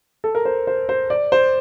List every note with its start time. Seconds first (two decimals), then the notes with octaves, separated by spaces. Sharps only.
0.24 A4
0.35 A#4
0.45 C5
0.67 C5
0.89 C5
1.10 D5
1.32 C5